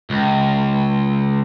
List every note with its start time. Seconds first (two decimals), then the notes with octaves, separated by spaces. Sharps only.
0.10 C#2